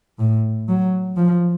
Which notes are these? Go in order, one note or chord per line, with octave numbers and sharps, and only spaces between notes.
A2
F#3
F3